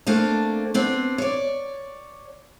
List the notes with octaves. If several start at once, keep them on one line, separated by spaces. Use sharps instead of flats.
A3 A#3 C4 D4
B3 C4 D4
C#5 D5